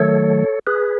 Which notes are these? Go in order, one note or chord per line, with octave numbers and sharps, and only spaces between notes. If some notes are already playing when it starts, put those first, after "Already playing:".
Already playing: D#3 F#3 A3 A4 C#5
G#4 B4